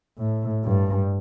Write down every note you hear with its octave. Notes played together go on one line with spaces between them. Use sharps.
A2
G2